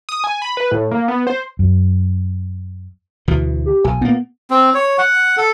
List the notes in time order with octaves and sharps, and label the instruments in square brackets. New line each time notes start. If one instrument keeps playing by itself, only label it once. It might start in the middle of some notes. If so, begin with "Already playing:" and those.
[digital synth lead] D#6
G#5
B5
B4
A2
A#3
B3
C5
[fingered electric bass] F#2
[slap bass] D2 B2 E3
[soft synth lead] G4
[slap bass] B1 [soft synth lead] G#5
[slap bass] A#2 A#3 [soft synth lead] B3
[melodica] C4
C#5
F#5
A4